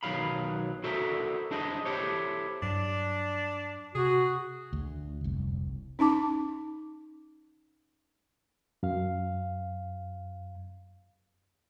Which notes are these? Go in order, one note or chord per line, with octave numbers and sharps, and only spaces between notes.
B1 D#3 F#3 F5 B5
E4 F#4 A4 A#4 C5 E5
D4 E4 G#4 C5 D#5
E4 G4 A4 C5 C#5
G2 F#3 D4
C3 F#4 G#4
D2
F1 C2
C#4 D#4 A5 D6
F#2 F5